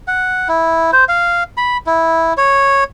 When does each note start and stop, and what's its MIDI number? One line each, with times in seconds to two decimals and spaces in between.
0.08 0.48 78
0.48 0.91 64
0.93 1.04 72
1.09 1.43 77
1.57 1.77 83
1.87 2.33 64
2.37 2.84 73